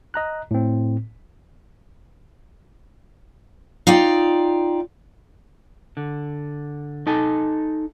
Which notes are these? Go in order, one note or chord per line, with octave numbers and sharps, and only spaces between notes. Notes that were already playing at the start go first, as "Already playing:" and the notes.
D#5 A#5 F#6
A2 C4
D#4 F4 D5 G5
D3
D#4 A4 G#5 A5